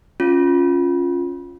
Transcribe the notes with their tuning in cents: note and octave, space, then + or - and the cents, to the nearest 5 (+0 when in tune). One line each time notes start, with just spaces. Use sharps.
C#4 +0 F4 +5